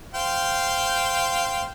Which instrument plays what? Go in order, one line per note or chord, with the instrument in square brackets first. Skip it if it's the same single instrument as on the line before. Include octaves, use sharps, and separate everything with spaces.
[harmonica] C5 F5 G5